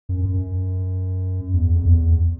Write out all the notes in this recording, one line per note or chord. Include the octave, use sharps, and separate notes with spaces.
F#2
F#2
E2
F2
E2